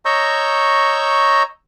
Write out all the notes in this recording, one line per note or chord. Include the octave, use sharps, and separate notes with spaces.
C#5 D#5 A#5 C#6 E6 G6